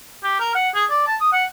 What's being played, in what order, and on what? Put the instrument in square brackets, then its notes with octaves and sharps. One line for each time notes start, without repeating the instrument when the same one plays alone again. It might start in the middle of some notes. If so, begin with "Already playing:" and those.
[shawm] G4
A#4
F#5
G#4
D5
A5
D#6
F#5